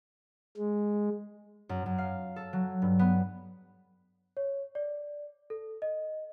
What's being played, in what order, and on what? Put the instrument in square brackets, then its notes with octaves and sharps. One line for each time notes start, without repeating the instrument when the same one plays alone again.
[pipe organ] G#3
[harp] F#2
F#2
F5
A4
F#3
G2
B3
[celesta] C#5
D5
A4
D#5